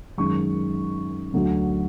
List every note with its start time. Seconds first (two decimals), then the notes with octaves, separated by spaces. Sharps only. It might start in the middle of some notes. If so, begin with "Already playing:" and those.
0.18 F#2 D#3 G#3 C#4 C#6
1.34 D2 D3 F#3 A3